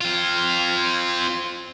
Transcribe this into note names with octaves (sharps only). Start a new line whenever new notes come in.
C4 F4